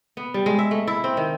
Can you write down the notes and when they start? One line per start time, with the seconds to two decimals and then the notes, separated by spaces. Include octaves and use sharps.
0.17 B3
0.34 G3
0.46 G#3
0.59 E5
0.71 A3
0.87 E4
1.04 C4
1.17 D#3